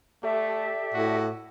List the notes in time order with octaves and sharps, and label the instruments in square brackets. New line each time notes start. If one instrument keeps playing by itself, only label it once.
[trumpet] A3 [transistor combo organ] G4 A4 D5 [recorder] E5
[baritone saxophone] A2 [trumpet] F#4